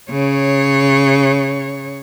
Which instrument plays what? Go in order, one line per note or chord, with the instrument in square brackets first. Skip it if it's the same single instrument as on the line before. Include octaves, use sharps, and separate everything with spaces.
[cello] C#3 C#5